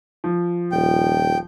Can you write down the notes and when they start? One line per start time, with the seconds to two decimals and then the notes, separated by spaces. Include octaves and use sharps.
0.24 F3
0.72 D#1 G5